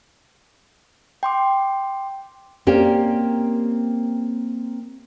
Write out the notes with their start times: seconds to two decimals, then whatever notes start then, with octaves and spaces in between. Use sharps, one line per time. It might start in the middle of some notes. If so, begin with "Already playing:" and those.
1.23 G5 C6 D6
2.67 A#3 C4 C#4 G4 A#4 D5